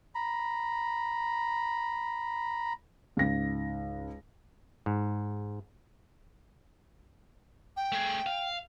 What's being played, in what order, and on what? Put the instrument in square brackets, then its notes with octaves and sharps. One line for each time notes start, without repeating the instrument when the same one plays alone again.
[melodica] A#5 B5
[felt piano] C#2 G#2 A#6
[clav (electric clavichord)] G#2
[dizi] G5
[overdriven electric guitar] A3 G#4
F5